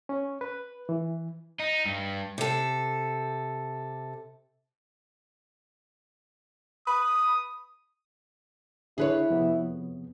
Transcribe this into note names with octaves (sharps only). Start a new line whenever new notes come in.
C#4
B4
E3
D#4
G2
C3 A4
B4 D#6
D3 E4 G#4 B4 C#5
F2 C3 B3